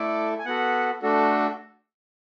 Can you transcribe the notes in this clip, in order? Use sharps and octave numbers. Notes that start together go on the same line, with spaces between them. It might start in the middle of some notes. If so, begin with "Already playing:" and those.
Already playing: A3 E4 A4 D5
G#5
B3 F#4 A4 F#5
A3 D4 F#4 A4